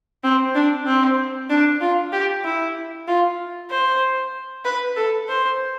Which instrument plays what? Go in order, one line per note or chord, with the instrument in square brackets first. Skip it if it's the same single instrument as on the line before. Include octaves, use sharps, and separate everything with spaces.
[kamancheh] C4
D4
C4
D4
F4
G4
E4
F4
C5
B4
A4
C5